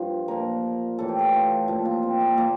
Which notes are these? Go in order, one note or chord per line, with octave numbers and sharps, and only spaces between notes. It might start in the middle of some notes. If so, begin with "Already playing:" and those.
Already playing: G2 A#2 F3 C5
A#2 F3 A#4
A2 E3 A4
G4
A4
F4
A#2 F3 F4
F4
C4
A#3
A#2 F3 A#3